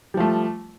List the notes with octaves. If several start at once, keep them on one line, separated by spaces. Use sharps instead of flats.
F3 G3 A3